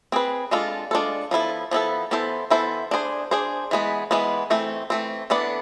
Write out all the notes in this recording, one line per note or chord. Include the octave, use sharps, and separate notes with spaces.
C4 G#4 B4
G#3 D4 F4 A4
G#3 D4 F4 A4
F3 B3 E4 A4
F3 B3 E4 A4
E3 B3 E4 A4 C5
E3 B3 E4 A4 C5
D4 G#4 C5
D4 G#4 C5
E3 G#3 B3
E3 G#3 B3
E3 A3 C4
E3 A3 C4
E3 B3 D4 A4 D5